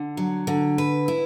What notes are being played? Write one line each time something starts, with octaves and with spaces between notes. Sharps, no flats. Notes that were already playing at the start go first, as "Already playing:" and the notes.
Already playing: D3
F#3
D3
B4
E4